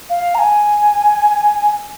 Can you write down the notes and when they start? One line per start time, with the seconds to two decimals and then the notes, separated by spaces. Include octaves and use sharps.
0.10 F5
0.35 A#5
0.38 G#5